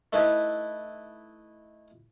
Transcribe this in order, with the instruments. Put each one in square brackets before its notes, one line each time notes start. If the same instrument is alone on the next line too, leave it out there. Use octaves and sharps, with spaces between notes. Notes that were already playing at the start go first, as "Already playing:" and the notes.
[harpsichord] A3 D#4 E4 B4